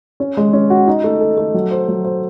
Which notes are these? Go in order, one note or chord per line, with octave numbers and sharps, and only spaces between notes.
C#4
G#3
C#4
F#4
D#4
A3
A4
A3
F#3
C5
F#3
C5